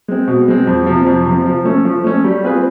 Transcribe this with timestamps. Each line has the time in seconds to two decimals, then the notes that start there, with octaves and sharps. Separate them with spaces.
0.08 G#3 C4
0.28 B2
0.48 G#3 C4
0.67 F2
0.86 C3 F3
1.06 F2
1.26 C3 F3
1.46 F3
1.65 A3 C#4
1.85 F3
2.04 A3 C#4
2.24 G3
2.44 C4 F4 G#4 B4